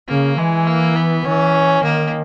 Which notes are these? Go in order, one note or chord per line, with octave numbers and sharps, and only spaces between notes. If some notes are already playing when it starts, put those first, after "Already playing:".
C#3 A#3
E3 G#3
A#3
B3
E3 C#4
D#3 A#3